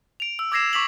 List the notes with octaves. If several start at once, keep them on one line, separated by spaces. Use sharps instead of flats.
D7 F7
E6
D6 E6 G#6 A#6 C7 E7
C#6 D6 B6 F7 F#7